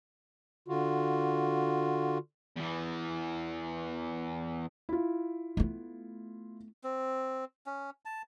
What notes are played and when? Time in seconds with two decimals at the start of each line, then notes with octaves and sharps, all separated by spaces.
0.68 D3 F4 F#4
2.56 E2 E3
4.89 E4 F4
5.57 A3 B3
6.84 C4
7.66 C#4
8.05 A5